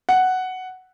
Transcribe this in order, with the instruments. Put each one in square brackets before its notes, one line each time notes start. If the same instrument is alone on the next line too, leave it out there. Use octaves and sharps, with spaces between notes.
[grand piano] F#5